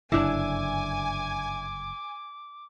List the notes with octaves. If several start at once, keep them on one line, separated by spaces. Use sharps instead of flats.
F#1 G2 D3 D4 E4 G#5 D6